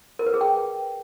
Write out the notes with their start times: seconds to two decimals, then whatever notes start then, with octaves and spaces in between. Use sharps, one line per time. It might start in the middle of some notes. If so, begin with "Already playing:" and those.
0.19 A#4
0.26 B4
0.34 G#4
0.41 G5